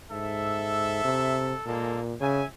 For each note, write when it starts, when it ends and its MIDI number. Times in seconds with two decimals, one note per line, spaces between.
0.11 1.00 44
0.11 1.61 69
0.11 1.61 76
1.04 1.53 48
1.66 2.14 46
1.66 2.00 56
1.66 2.00 58
1.66 2.00 69
2.21 2.42 49
2.21 2.46 76
2.21 2.46 80